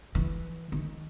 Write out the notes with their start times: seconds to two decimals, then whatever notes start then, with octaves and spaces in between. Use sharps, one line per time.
0.15 E3
0.72 D#3